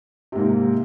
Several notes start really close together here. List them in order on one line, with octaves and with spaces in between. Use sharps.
C3 G#2 A#3